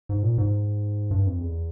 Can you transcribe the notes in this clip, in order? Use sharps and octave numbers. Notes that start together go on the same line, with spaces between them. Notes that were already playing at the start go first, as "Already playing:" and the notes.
G#2
A#2
G#2
G2
F2
E2